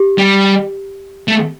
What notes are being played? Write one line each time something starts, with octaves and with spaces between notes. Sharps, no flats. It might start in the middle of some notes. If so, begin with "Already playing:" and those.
Already playing: G4
G3
A3